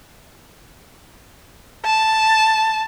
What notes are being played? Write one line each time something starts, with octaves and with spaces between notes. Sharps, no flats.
A5